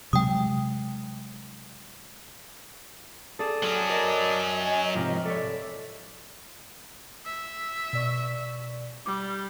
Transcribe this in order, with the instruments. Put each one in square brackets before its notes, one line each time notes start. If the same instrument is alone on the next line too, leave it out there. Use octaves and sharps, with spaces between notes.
[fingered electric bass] C3 F#3 G#3 [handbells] G5 D#6
[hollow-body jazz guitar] G#4 A4 [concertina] D5 A5 D#6
[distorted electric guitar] F#3 C#4
[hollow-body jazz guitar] A#4 [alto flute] D#5
[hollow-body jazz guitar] G#5
[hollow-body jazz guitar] G#2 C3 F3 [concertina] G4 A#4
[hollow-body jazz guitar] A4 C#5 [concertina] D5 E5
[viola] E5
[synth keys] B2 D5 C#6
[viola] G3 [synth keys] D6